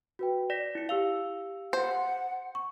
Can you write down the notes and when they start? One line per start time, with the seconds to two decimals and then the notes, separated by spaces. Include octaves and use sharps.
0.19 F#4 B4 G5
0.50 D5 A#6 B6
0.75 E4 C#7
0.89 G4 F5 E6 F7
1.73 C5 F#5
2.55 C#6